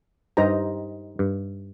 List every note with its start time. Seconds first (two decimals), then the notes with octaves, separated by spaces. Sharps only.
0.37 G2 D#4 G4 C5 D#5 A#5
1.19 G2